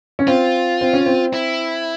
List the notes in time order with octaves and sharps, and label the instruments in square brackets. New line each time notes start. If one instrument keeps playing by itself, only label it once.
[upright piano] C#4
[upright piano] C4 [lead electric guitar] F4
[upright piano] C4
C#4
C4
[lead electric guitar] E4